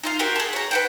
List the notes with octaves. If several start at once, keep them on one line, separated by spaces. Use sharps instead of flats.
D#4 F4 F5
F#4 G4 A#4
G#4 A4
C#5 A#5
B4 F#5 G5